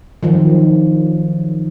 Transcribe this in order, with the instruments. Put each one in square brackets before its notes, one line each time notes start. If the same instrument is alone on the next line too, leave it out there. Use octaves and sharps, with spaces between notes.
[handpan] D#3 F3 F#3